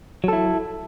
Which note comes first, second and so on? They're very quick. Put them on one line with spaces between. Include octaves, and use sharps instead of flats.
F#3 A4 E4